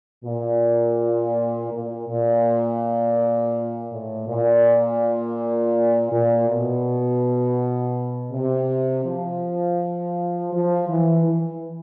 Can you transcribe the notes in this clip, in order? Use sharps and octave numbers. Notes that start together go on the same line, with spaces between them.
A#2
A#2
A#2
A2
A#2
A#2
B2
C3
F3
F3
E3
E3